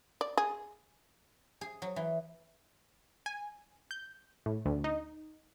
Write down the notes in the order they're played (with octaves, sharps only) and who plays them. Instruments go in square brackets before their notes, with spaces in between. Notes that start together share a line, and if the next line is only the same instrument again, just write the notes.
[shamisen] D5
G#4
[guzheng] G#4
F#3
E3
[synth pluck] G#5
G6
A2
D2
D#4